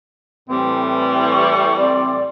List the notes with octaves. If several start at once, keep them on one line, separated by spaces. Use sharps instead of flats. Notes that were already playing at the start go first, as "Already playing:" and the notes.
A2 E3 G3 C4
C#6
C4 D5